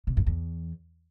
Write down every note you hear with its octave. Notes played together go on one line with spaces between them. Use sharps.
B2
F#2
E2